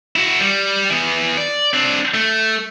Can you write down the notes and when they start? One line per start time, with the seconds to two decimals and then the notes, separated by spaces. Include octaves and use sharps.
0.16 E4 F#4
0.40 G3
0.90 E3 B3
1.38 D5
1.73 C4 D4
2.14 A3